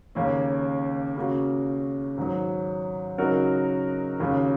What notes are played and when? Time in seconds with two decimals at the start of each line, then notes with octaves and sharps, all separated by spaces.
0.15 D#2 C#3 A#3 C#4
1.16 C#3 A#3 F#4
2.17 G#2 D#3 F#3
3.18 C#3 F#3 D#4 F#4 A#4
4.20 D#2 C#3 A#3 F#4